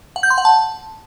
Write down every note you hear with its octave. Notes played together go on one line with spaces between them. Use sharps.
F#5
G6
C6
F#5
A5